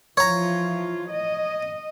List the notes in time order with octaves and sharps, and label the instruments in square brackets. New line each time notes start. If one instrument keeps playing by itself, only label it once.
[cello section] E3 F3 F4 [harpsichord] C#5 A#5
[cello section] D#5